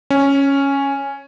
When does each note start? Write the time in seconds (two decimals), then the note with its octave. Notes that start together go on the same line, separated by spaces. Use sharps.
0.10 C#4